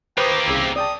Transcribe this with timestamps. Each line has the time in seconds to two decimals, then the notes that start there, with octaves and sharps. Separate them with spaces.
0.18 A#3 G4 B4 C5 G5 C#6 D#6
0.46 C2 C#3 E4
0.76 D5 G5 A5 D#6